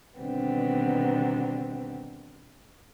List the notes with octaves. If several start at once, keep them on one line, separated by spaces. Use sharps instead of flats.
B2 D3 D#3 G3 B3 C4